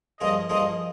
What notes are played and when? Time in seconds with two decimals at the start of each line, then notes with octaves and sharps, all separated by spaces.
0.21 G2 F3 A#3 F4 G#4 D#5
0.49 G2 F3 A#3 F4 G#4 D#5